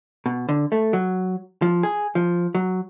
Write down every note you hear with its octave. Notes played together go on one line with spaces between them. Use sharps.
B2
D3
A3
F#3
F3
G#4
F3
F#3